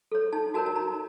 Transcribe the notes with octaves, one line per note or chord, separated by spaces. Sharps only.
A4 C#5
D#4 A5
F#4 A#4 C#5 A5
A5
D#4 A#5